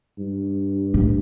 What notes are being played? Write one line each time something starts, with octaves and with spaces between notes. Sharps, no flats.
G2
A2